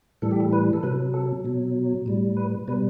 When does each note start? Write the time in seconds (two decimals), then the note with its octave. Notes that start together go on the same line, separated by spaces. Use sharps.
0.22 A2 E3 G3 A4
0.31 G4
0.40 A4
0.53 B4
0.73 A4
0.83 C3 F#3 B4
1.14 A4
1.45 B2 F#3
2.06 A2 G3
2.37 B4
2.68 B2 G3 B4